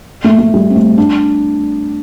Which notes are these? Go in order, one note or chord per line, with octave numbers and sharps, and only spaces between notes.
A3
A3
G3
C4
A3
D4